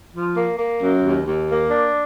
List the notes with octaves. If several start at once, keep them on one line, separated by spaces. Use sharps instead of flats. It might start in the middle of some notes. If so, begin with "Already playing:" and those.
F3
A#3
A#3
F#2
D#2
D#2
A#3
D4